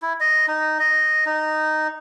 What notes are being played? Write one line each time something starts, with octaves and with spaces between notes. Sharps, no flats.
E4
D#5
D#4
D#5
D#4